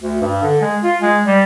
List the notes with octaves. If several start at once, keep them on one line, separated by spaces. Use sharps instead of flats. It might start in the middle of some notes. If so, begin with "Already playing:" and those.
D2
G2
D3
G#3
F4
G#3
G3